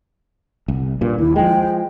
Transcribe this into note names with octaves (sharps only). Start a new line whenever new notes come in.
C2
G2 A#2
D#2 E4
F3 G#3 G5